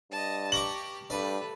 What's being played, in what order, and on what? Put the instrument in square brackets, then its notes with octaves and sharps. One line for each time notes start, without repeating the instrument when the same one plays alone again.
[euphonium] G2 [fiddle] D#5 A5
[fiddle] G4 [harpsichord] A#5 C#6 D6 [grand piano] F#7
[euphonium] G2 [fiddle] A3 B4 [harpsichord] D5